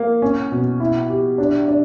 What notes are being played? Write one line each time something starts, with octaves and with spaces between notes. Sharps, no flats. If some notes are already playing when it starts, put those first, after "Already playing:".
Already playing: A#3
C#4
B2
E4
G4
D4
D4